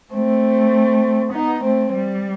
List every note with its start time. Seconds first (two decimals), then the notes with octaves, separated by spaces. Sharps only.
0.14 A3 C4
1.33 B3 D#4
1.63 A3 C4
1.93 G3